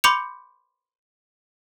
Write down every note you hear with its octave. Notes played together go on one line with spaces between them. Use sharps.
B5 C6 D6 G6 C#7 F7